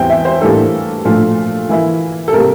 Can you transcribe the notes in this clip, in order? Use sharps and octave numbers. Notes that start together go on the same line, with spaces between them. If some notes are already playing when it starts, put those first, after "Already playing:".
Already playing: E2 E3 G3 C4 E4 C5 G5
E5
C5
A2 E3 G3 A#3 D4 A4
A#2 F3 A3 D4 F4
E3 A#3 E4
A4
C3 G3 A#3 A#4